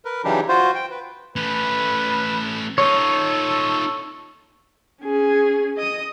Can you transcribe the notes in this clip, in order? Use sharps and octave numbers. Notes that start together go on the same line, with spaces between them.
A#4 B4
C#3 E3 F#3 D4 D#4 G4
F4 F#4 C5
G5
B4
A3 C#4 B4
D#4 F4 A4 C#5
C#4 G#4
D#5 D#6